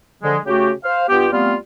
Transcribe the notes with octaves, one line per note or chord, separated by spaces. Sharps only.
D3 F3 G#3
C#3 A3 F#4 G4
C5 F5
G2 B3 F4 G4
G3 A3 B3 C4 F4 F5